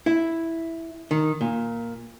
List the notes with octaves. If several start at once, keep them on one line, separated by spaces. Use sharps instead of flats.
E4
D#3
A#2